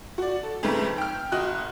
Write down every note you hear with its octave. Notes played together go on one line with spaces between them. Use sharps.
F#4 D5
A4
F2 G#2 C#3 A3 B4
G5 F6
F#1 F#4 D#5 F#6